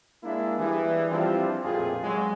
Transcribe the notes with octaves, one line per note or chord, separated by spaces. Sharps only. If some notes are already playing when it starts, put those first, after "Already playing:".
G#3 A#3 D4 E4
E3 G3 G#4
F3 G3 C4 D4 E4 F4
A1 F2 A#2 F4 G4 G#4
F#3 G#3